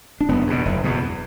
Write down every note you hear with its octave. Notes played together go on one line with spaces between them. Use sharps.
D4
F#1 B3
E2 B2
F#1
E2 B2